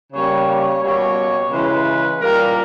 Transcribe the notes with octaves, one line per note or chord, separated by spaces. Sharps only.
C#3 G3 A#3 C#5
C#5
B2 G3 A#3 C#5
C#3 E3 G#3 B4
A#2 G3 A#3 A#4